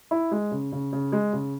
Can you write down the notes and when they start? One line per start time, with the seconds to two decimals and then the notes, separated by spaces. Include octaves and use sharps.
0.11 E4
0.31 G#3
0.51 C#3
0.72 C#3
0.92 C#3
1.12 G#3
1.33 C#3